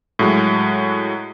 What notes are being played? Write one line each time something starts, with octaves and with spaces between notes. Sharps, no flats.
A2 F#3 G#3